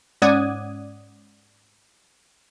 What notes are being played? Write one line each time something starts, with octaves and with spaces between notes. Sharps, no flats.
G#2 C#4 D5 F#5 D#6 G#6